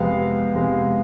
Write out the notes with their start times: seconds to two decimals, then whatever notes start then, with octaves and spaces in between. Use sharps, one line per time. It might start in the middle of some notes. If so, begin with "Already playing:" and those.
Already playing: F2 C3 G#3 B3 F5
0.53 F2 C3 G#3 B3